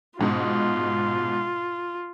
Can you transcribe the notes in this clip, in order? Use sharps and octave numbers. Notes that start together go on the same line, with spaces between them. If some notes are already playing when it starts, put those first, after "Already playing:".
A#1 G#2 B2 F4